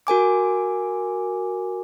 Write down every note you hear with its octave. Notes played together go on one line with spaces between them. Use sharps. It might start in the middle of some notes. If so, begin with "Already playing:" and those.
F#4 A#4 G#5 D6